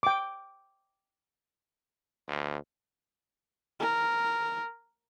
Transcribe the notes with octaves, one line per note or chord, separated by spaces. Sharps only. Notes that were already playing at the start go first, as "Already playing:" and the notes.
G5 D6
D2
A#4